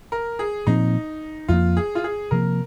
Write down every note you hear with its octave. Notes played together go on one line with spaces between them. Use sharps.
A#4
G#4
A#2 F3 C4 D#4
F2 F3 A#3 F4
G#4
F4
G#4
C3 F3 A#3 A#4